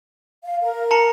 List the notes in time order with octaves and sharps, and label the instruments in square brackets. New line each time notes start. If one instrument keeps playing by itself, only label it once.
[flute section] F5
A#4
[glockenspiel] A5 A#5 C#7